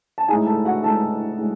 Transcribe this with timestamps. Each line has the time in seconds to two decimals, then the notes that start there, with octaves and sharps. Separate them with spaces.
0.18 A5
0.28 D#4 G#4 G#5
0.31 A2 G#3
0.47 A4 A5
0.65 F#4 F#5
0.83 A2 G#3 D#4 A4 A5
1.39 A2 G#3